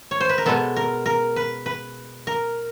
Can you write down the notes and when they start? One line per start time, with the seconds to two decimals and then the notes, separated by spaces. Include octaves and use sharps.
0.11 C#5
0.21 C5
0.29 B4
0.38 A#4
0.46 B2 G#3 B3 A4
0.76 A#4
1.06 A#4
1.36 B4
1.66 B4
2.27 A#4